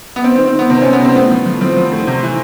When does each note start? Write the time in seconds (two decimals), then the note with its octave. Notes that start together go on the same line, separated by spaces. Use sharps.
0.16 B3
0.24 D#3 C4
0.36 C4
0.40 D#3
0.47 C4
0.55 D#3 B3
0.70 C3 C4
0.82 C3 C#4
0.93 B3
1.01 C3 C4
1.16 A2 B3
1.31 F3
1.46 F3
1.61 F3 C4
1.77 F3
1.92 A2
2.07 C3
2.23 E3